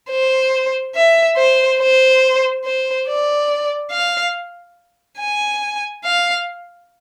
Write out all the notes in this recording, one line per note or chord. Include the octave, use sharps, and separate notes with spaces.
C5
E5
C5
C5
C5
D5
F5
G#5
F5